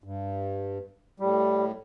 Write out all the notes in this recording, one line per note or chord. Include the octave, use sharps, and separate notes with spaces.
G2
A2 G3